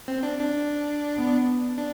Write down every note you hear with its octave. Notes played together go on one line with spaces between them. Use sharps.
C4
D4
D4
B3
D4